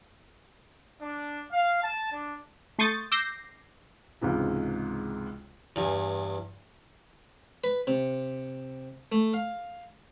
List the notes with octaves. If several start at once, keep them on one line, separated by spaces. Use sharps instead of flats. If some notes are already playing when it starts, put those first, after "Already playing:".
D4
F5
A5
D4
A3 C6 C#6 D#6 G6 A6
D6 E6 G6 A#6 C7
C#2 G#2 C3 E3
E2 G2 G#5
B4
C3
A3
F5